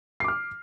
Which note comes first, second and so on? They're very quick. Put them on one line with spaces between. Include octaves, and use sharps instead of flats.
C7 D6 F6